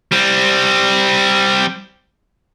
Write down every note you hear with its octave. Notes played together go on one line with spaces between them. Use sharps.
G3 C4